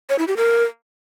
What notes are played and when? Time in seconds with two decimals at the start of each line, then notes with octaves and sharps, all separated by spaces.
0.10 C#5
0.19 E4
0.28 G4
0.37 A#4